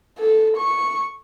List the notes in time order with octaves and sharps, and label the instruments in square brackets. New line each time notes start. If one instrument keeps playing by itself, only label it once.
[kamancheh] A4
C#6